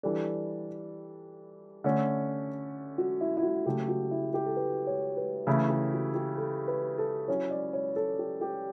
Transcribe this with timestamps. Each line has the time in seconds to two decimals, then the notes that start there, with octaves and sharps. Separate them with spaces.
0.03 E3 G3 D4 A4
1.84 D3 A3 C#4 A4
2.98 F#4
3.21 E4
3.37 E4
3.43 F#4
3.66 C#3 F#3 A3 G4
3.88 F#4
4.11 E4
4.34 G4
4.46 A4
4.56 B4
4.87 C#5
5.17 B4
5.47 C#3 E3 A3 E4 A4
5.70 G4
5.93 F#4
6.15 G4
6.38 A4
6.68 B4
6.98 A4
7.28 F#3 C#4 E4 C#5
7.51 D5
7.73 C#5
7.96 A4
8.19 G4
8.41 G4